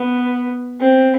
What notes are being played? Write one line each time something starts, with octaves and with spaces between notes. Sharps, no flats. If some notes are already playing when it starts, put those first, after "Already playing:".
Already playing: B3
C4